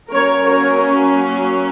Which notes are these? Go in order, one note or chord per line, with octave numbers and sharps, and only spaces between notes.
F#3 A#3 C#4 A#4 C#5
A#4 C#5